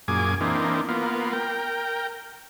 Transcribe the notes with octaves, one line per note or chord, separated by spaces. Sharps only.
F#2 A#2 G#4 G#5 D6
E3 A#3 C4 D4 D#4
A#3 B3 F4
A#4 G5